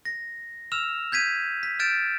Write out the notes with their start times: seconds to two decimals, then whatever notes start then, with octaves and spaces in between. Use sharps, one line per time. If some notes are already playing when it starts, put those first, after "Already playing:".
0.05 A#6
0.72 E6 F6 E7 F7
1.12 G6 G#6 B6 D#7
1.63 B6
1.79 F6 G6 A6 D7 E7